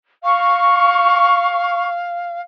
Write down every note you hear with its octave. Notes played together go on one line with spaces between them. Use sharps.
F5 C#6